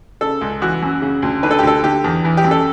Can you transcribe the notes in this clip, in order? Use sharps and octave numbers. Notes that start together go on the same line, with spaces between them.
C#3 A4
C#2
E3 F#4
F#2
C#3
D2
D3 B4
A4
G4
D2 A4
D3 G4
E2
E3
G4
F#2
A4